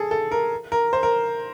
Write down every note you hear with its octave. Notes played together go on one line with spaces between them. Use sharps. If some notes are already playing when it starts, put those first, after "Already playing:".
Already playing: G#4 A4
A4
A#4
A#4
C5
A#4